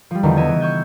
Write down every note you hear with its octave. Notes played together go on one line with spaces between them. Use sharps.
F3 G3
E2 D3 D#3 F3
B3 D#5 E6 G#6
C#3 E3 D#7
C#6 E6 G6 G#6